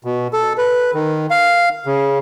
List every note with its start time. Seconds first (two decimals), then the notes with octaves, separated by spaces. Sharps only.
0.04 B2
0.33 A4
0.58 B4
0.94 D#3
1.30 F5
1.86 C#3